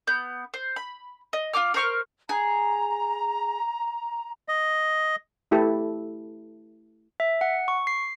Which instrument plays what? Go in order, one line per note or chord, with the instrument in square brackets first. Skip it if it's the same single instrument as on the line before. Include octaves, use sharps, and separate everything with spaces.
[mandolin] B3 G6
C5
B5
D#5
F4 G4 D6 F6
A#4 C5 C#6 F6
[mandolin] G#4 [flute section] A#5
[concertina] D#5
[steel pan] A3 E4 G4 A4 B4
[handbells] E5
F#5
C#6
C7